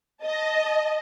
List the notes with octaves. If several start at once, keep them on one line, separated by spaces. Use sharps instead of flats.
D#5 A5